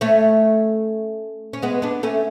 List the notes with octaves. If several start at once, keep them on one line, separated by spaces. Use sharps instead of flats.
A3 C#4
C#4
G#3 B3
B3 D4
A3 C#4